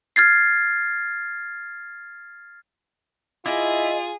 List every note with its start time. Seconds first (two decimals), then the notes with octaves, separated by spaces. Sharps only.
0.16 F6 G#6 A6 C7
3.46 E4 F4 G#4 D5 D#5